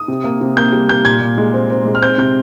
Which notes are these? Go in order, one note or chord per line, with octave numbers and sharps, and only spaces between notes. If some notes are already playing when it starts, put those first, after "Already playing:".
Already playing: D#6
C3
A#3
C3
A#3 G6
G3
A#3 G6
A#2 G#6
A#2
G#3
C4
C4
G#3
F6
C4 G6
C3 G6